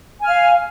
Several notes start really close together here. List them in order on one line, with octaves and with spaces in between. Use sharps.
G#5 F6 F5